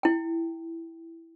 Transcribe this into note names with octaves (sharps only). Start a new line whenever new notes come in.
E4 G5